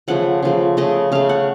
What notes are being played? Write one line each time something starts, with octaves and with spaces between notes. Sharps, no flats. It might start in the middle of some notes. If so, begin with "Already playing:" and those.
C#3 F3 A3 F#5
C#3 F3 A3
C#3 A3 D#5
C#3 A3 F5
F#5